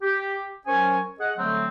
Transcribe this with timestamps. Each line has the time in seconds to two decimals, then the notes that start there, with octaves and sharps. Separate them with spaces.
0.02 G4
0.67 F#3 C#4 A#4 C5 C#5 G#5
1.20 G#4 D#5 F#5
1.38 D3 F#3 G3 A3 C4